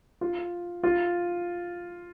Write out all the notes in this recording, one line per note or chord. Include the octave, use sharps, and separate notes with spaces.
F4
F4